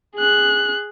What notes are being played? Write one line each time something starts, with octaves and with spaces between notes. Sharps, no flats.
G#4 F#6